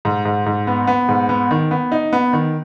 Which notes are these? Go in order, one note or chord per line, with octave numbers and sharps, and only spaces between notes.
G#2
G#2
G#2
B3
B3
G#2
B3
D#3
B3
D#4
B3
D#3